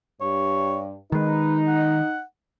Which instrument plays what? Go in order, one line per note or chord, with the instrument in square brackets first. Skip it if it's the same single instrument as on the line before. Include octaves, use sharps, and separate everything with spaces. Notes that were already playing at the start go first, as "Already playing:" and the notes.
[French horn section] G2 [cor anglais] C#5
[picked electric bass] D#3 G#3 [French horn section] D#4 [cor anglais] B4
[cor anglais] F#5